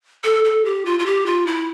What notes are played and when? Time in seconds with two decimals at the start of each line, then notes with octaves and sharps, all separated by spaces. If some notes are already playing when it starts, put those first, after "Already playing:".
0.24 A4
0.44 A4
0.65 G4
0.85 F4
0.99 F4
1.06 G4
1.26 F4
1.47 E4